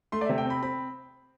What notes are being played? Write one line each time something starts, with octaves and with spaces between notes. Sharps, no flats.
A3 C6
D5
C3 E5
G5
C4 B5
C4 B5